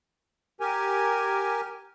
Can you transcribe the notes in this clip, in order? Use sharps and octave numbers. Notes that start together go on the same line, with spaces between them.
G4 A#4 G#5